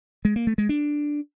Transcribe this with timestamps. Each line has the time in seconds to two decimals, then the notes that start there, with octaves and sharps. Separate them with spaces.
0.25 G#3
0.36 A#3
0.47 A3
0.58 G#3
0.69 D4